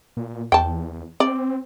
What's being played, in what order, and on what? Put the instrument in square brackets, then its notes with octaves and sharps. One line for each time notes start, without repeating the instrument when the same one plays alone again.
[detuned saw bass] A#2
[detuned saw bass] E2 [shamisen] G5 A5
[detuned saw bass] C4 [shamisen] D5